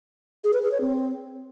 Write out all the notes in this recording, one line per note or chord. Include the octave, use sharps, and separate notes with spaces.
G#4
B4
G#4
C#5
C4